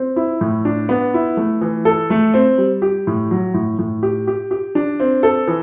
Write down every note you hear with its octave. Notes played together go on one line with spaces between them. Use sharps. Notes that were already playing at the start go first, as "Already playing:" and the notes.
Already playing: C4
E4
A2
D4
B3
E4
A3
E3
A4
A3
C4
G3
G4
A2
F#3
A2
A2
G4
G4
G4
D4
C4
A4
E3